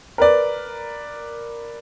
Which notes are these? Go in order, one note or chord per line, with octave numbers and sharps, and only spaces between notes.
A#4 B4 D5